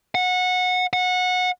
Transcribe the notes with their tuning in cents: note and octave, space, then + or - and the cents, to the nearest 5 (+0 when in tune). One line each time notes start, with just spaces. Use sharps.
F#5 -20
F#5 -20